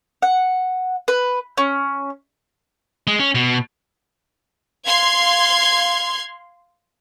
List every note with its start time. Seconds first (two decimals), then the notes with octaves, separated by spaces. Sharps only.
0.22 F#5
1.08 B4
1.58 C#4
3.07 G#3
3.19 C#4
3.35 B2
4.86 F5 C6 G#6